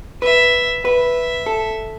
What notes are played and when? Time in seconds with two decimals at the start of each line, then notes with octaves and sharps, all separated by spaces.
0.22 B4 E5
0.84 B4 E5
1.46 A4